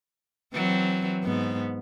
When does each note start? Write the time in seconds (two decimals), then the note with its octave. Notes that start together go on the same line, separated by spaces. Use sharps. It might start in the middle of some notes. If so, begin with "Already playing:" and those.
0.54 E3 F#3 C4
1.24 G#2 B3